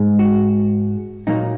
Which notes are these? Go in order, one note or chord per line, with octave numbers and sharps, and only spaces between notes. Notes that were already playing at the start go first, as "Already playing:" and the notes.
Already playing: G#2 G#3
F#4
A#2 F#3 A#3 D#4